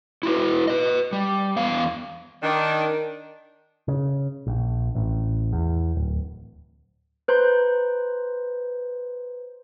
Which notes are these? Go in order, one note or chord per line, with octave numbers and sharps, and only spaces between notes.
E4 F#4 B4
B4 D#5
G3
E2 B3 F5
D#3 D4
C#3
A#1
A1
E2
D1
B4 C5 A#5 C6 G6